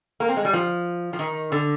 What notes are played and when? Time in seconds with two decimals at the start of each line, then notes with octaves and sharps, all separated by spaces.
0.20 A#3
0.29 C4
0.37 G#3
0.45 G3
0.53 F3
1.13 F3
1.19 D#3
1.52 D3